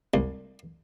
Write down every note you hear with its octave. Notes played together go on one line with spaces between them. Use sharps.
C2